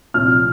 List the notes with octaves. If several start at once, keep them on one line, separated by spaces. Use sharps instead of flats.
C2 A#2 F3 F6